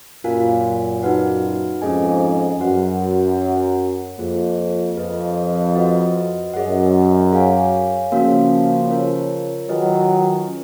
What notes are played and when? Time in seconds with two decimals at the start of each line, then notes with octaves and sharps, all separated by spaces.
0.24 F#2 A#2 F4 A#4 F5 G#5
1.03 D#4 F#4 B4 F#5
1.82 F2 G#2 C#4 G#4 D#5 G#5
2.60 F#2 F#4 B4 F#5
3.39 F#4 C#5 F#5
4.18 F2 A#3 F4 G#4
4.96 F2 G#4 B4 D#5
5.75 F#4 B4 D#5 F#5
6.54 F#2 G#4 D#5 F#5
7.32 G#4 C#5 F5 G#5
8.12 C#3 F3 A#3 C#4 F#4 A#4 F5
8.90 F4 A#4 C#5
9.69 D#3 F#3 F4 G#4 B4 D#5 G#5
10.48 C#4 F4